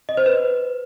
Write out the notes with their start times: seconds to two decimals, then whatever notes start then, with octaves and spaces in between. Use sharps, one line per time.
0.09 D#5
0.17 C5
0.26 B4